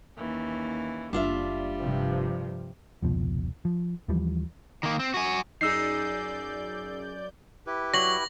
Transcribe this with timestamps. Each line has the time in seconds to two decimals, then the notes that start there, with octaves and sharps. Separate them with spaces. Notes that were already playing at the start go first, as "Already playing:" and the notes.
0.17 D#2 E3 C#4
1.13 F#1 G3 D4 F4 E5
1.81 G2 C3 F3
3.02 F1 C#2 B2 F3
3.65 F3
4.08 D#2 E3 F3 G3
4.83 D#3 A#3
5.00 C4
5.14 F#4 G#5
5.61 F#2 D#4 G#4 D5 E6 G6 C7
7.67 E4 G4 B4
7.94 F#3 A#6 F#7